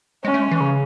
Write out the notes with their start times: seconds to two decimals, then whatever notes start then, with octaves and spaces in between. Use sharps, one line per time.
0.24 G#3 C#4
0.34 A3
0.42 G#3
0.51 E3
0.61 C#3